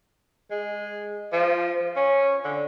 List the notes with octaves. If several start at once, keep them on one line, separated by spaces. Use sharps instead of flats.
G#3
F3
C#4
D3